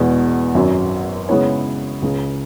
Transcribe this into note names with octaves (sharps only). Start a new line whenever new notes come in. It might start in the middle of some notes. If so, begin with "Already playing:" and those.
Already playing: E2 B2 G#3
G#1 F#2 F#3 C#4
C#3 G#3 B3 E4 C#5
C#2 C#3 G#3